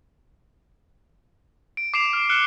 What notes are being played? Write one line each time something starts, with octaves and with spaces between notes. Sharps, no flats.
D7
D6 C7 D7 E7 F7
F6
F6 F#6 C#7 G7